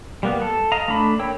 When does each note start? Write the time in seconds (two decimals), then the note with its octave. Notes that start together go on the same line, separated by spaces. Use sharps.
0.23 G3 A#3 B3
0.42 A4
0.72 D#5 F5 A#5
0.88 A3 D4 B5
1.19 A#3 C#5 G5 E6